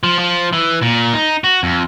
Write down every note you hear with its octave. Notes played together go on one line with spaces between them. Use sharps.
F3
F3
E3
A#2
D#4
F#4
F2